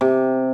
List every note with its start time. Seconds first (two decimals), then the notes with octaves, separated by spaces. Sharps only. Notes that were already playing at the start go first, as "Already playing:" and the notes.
0.01 C3